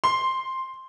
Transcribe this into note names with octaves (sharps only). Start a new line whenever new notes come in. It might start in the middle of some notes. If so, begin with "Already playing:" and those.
C6